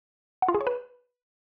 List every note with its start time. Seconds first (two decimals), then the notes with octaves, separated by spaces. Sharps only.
0.42 F#5
0.48 F4
0.54 G#4
0.61 C#5
0.67 B4